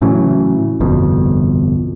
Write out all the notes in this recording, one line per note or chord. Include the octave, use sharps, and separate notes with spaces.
A2 C#3 E3 F#3
G1 C2 F2 B2